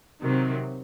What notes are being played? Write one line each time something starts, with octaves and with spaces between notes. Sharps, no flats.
C3 D#3 F#3